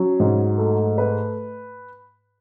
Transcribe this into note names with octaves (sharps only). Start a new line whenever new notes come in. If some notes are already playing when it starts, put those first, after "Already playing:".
Already playing: F#3 C#4
G#2
A3
B4